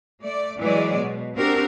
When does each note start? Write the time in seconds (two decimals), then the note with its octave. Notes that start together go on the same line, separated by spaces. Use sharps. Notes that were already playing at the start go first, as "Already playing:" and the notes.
0.21 A3 D5
0.58 E3 F#3 G#3 D5
0.97 B2
1.35 C4 D4 F#4 G4 A#4